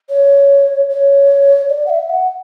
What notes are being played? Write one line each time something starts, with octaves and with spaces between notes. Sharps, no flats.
C#5
C#5
D5
F#5
E5
F#5